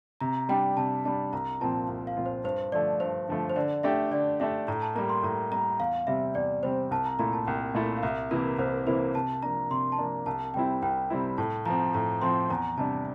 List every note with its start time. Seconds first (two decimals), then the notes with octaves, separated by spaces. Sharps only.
0.21 C3 A#5
0.49 G3 D4 G5
0.77 C3 A5
1.05 G3 D4 A5
1.33 C2 A#5
1.60 A#2 F3 C4 F4 A5
1.88 C2
2.07 F5
2.17 A#2 F3 C4 F4
2.26 C5
2.44 G2 C5
2.72 D3 F3 A3 D5
3.00 G2 C5
3.28 D3 F3 A3
3.49 C5
3.56 D3 D5
3.83 A3 D4 G4 E5
4.11 D3 D5
4.40 A3 D4 G4 E5
4.68 A2 A#5
4.82 A5
4.95 G3 A#3 A#5
5.09 C6
5.23 A2 A#5
5.51 G3 A#3 A#5
5.80 E2 F5
6.07 C3 G3 C4 E5
6.35 E2 D5
6.63 C3 G3 C4 C5
6.91 C2 A5
7.06 A#5
7.19 A#2 A3 E4 A#5
7.33 A5
7.47 C2 G5
7.74 A#2 A3 E4
7.97 F5
8.03 C2 E5
8.31 C3 E3 A#3 E4 A#4
8.58 C2 C5
8.87 C3 E3 A#3 E4 C5
9.15 C3 A5
9.43 F3 A#3 D4 A#5
9.71 C3 C6
9.92 A5
9.98 F3 A#3 D4 A#5
10.26 C2 A5
10.54 C3 G3 C4 E4 G5
10.82 C2 G5
11.10 C3 G3 C4 E4
11.38 A2 A5
11.65 F3 C4 A#5
11.94 A2 A#5
12.22 F3 C4 C6
12.50 E2 A#5
12.78 C3 G3 D4 A5